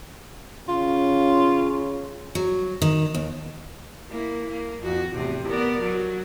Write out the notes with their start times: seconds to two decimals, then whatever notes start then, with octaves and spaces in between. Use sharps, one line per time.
0.69 C#3 C#4 F4
2.35 F#3
2.82 D#3
3.15 D#2
4.10 A#3 E4
4.51 A#3
4.83 F2 F#4
5.13 E2 A2 C3
5.47 B3 A#4 D5
5.81 F#3